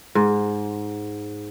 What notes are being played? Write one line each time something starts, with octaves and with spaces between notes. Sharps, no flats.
G#2